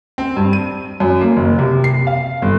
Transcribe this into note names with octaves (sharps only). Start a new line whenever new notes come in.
C4
G2
D#7
F#2
A#3
F#1
C3
C7
F5
G1